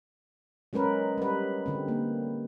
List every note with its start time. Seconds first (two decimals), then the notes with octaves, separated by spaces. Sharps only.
0.73 F#3 G#3 C#4 A#4 B4
1.18 G3 B4
1.66 D3 C4
1.88 A#3